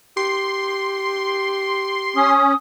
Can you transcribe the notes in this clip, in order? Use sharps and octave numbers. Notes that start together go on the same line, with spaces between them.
G4 C6
C#4 D#6